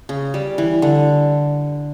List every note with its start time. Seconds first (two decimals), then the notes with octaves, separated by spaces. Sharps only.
0.09 C#3
0.34 G3
0.58 E3
0.82 D3